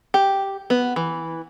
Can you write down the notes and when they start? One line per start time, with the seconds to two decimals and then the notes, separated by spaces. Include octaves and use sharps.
0.14 G4
0.70 B3
0.96 E3